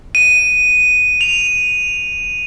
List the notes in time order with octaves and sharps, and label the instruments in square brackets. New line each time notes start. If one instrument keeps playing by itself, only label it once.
[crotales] D#7
F7